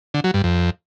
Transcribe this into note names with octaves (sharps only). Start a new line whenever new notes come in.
D3
F#3
G2
F2